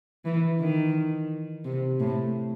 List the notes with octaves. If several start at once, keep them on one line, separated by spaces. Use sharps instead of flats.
E3
D#3
C3
A2